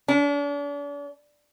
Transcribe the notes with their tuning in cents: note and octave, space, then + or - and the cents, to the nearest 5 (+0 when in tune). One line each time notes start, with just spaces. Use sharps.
D4 -40